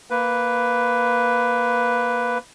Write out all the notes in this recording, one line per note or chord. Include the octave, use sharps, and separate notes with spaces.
A#3 B4